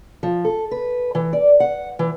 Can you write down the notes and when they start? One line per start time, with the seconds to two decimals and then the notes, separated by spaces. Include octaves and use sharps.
0.23 F3
0.45 A4
0.71 B4
1.15 E3
1.33 D5
1.60 F#5
1.99 E3